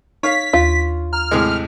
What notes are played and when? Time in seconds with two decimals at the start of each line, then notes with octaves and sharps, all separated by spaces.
0.23 D#4 C#5 F5 B6
0.53 D#2 F4
1.13 A#5 F6
1.31 A2 C3 G#3